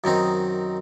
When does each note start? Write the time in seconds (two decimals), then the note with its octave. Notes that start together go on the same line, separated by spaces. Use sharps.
0.04 F#2 D#3 C4 D#4